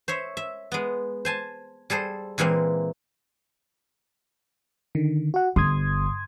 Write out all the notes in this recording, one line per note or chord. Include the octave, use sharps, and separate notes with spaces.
C5 C#5 E5
E5
G#3 B3
C5 G#5 A5
G3 G#4 A4 C5
A#2 E3 G#3 A#3 C4
D3 D#3
F#4 F#5
G1 C6 D#6 G#6